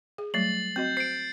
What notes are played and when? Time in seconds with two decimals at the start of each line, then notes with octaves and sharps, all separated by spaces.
0.18 G#4
0.34 F#3 G3 A3 A6 C7 F#7
0.76 C4 F#4 D#5 G6
0.97 C5 C7 D7